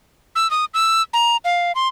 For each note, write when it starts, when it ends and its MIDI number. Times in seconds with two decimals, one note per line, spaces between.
0.36 0.50 88
0.51 0.65 87
0.74 1.02 88
1.13 1.37 82
1.45 1.72 77
1.75 1.88 84